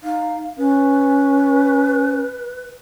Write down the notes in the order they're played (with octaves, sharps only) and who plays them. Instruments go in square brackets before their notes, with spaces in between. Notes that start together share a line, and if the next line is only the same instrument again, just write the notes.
[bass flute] D#4 [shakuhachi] F5
[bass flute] C#4 [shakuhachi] B4